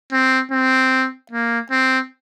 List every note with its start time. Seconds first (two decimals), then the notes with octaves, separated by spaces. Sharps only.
0.12 C4
0.52 C4
1.31 A#3
1.71 C4